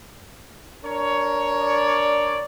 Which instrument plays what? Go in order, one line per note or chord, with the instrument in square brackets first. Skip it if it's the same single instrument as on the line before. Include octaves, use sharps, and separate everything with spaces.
[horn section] D4 A#4 C#5
[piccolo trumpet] D5